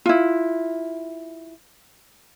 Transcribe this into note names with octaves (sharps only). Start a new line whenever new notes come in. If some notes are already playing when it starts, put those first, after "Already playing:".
E4 F4